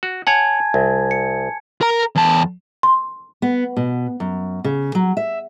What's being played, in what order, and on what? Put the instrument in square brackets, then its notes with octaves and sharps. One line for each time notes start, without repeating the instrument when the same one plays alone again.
[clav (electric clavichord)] F#4
[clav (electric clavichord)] C#5 F#5 [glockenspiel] G#5 A5 G#6
[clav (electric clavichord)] C2
[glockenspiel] C#7
[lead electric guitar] A#4 A#5
E2 A5
[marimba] C6
[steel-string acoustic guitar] B3
B2
F#2
C#3
F#3
E5